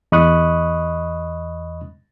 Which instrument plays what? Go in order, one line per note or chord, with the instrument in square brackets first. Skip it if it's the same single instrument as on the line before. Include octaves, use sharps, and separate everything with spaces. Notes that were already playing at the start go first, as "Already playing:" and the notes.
[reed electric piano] E2 D#5 B5 C#6 D#6 F#6